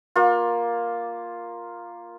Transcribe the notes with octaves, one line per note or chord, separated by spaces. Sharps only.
A#3 F4